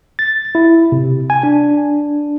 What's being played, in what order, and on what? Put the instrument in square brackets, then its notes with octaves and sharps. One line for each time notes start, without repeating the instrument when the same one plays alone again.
[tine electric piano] A6
E4
C3
G#5
D4